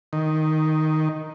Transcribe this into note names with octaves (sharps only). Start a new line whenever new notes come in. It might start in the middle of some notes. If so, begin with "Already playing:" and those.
D#3